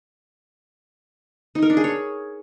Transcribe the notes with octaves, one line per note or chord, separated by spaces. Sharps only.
D#4
A#4
D4
G#4
C#5